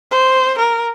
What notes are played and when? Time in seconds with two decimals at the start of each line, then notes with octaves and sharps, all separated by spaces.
0.11 C5
0.58 A#4